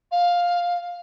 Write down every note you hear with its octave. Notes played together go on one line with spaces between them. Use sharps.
F5